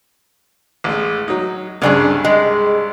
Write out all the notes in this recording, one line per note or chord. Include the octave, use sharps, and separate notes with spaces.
A1 G#3
F#3 D#4
C2 G2 C#3 D4 G#4
G#3